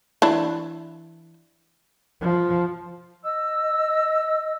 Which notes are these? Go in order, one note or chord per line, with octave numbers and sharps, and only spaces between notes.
E3 D4 E4
F3
D#5 E6